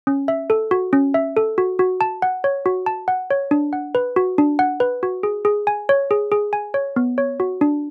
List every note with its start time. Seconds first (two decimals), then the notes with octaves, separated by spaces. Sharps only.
0.07 C#4
0.28 E5
0.50 A4
0.71 F#4
0.93 C#4
1.14 E5
1.37 A4
1.58 F#4
1.79 F#4
2.01 A5
2.22 F#5
2.44 C#5
2.66 F#4
2.86 A5
3.08 F#5
3.31 C#5
3.51 D4
3.73 F#5
3.95 B4
4.16 F#4
4.38 D4
4.59 F#5
4.80 B4
5.03 F#4
5.23 G#4
5.45 G#4
5.67 G#5
5.89 C#5
6.11 G#4
6.32 G#4
6.53 G#5
6.74 C#5
6.96 B3
7.18 C#5
7.40 F#4
7.61 D4